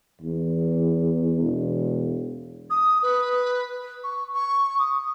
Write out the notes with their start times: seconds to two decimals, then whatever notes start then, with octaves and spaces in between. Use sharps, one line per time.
0.21 E2
1.41 E1
2.70 D#6
3.03 B4
4.04 C#6
4.34 C#6
4.79 D#6